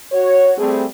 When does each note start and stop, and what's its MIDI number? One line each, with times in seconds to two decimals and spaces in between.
0.12 0.52 66
0.12 0.52 73
0.58 0.85 55
0.58 0.85 57
0.58 0.85 60
0.58 0.85 68